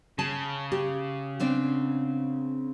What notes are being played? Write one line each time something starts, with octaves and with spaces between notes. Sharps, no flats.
C#3 A5
G4
B3 C4 D4